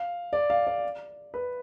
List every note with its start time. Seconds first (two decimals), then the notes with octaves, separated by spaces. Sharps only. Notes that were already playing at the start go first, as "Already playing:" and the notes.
Already playing: F5
0.33 D5
0.50 F5
0.67 D5
1.34 B4